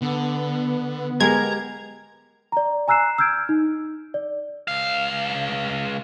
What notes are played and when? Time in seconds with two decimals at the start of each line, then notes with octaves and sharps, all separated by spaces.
0.02 D3 B3
1.20 G#3 G4 A#4 A#5 G#6
2.52 D5 A#5
2.88 G#5 A#5 E6 F#6 C7 E7
3.18 E6 F6 G6 G#6 D7
3.49 D#4
4.14 D5
4.68 C#2 F5